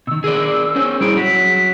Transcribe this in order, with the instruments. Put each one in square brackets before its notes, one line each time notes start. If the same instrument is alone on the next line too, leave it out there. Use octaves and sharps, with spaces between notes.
[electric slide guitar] B2 D#3 [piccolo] E6
[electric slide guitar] G#4 A#4 D5
C#4 C5 C#5
[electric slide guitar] G3 E4 G#4 [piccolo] D7
[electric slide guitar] F#3 [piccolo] B6